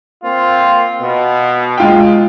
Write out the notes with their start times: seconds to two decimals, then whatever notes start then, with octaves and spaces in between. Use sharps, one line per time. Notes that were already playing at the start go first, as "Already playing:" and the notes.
0.24 A#3 C4 F4
1.02 B2
1.78 G#3 F4 G5